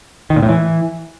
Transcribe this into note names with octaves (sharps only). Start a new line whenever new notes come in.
D#3
A#2
A2
E3